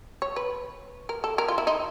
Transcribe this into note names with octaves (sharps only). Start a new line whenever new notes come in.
C#5
B4
A#4
A4
A#4
F4
E4
D#4